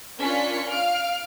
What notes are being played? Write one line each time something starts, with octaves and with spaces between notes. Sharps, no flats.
C#4 D4 F4 A#4 B6 C#7
F5 F6 D7